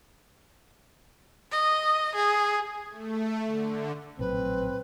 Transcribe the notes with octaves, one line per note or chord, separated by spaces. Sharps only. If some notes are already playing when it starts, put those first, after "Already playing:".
D#5
G#4
A3
D3
A#1 A2 F#3 C4 B4